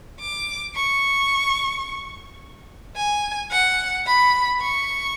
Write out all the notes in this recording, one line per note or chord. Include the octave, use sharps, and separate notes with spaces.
D6
C#6
G#5
F#5
B5
C#6